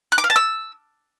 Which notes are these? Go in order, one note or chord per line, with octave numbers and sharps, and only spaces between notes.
F#6
D6
F5
A5
E6